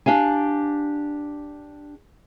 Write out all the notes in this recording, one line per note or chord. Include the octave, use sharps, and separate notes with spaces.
D4 G4 F5 G#5